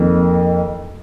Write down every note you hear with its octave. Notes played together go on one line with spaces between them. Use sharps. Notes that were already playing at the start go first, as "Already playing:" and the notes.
Already playing: F2 D#3 A#3 A#4